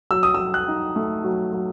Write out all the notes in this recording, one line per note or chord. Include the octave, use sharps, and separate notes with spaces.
F#3 E6
D#6
F#3 E6
F#6
D#4
A3
F#3
F#3